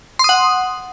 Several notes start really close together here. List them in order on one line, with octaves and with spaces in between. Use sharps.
C6 D#6 F#5